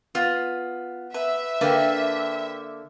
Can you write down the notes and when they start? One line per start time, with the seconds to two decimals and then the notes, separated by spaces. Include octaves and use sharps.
0.15 B3 F4
1.14 B4 E5
1.61 D3 A#3 B4 G5